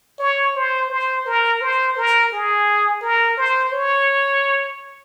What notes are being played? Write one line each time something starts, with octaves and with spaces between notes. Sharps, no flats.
C#5
C5
C5
A#4
C5
A#4
G#4
A#4
C5
C#5